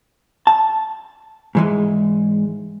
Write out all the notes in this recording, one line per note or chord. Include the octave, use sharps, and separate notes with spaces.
A5
G#2 E3 G#3